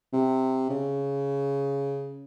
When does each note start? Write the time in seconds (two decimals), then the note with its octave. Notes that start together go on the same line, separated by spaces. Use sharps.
0.13 C3
0.70 C#3